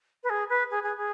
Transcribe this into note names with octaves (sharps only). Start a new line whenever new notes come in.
B4
G#4
B4
G#4
G#4
G#4